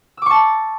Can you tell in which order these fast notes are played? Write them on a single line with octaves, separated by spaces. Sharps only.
E6 D6 C#6 A5